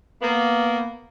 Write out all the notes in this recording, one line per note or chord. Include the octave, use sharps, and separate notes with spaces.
A#3 B3